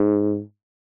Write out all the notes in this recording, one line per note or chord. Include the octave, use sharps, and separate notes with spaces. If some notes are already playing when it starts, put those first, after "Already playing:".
Already playing: G#2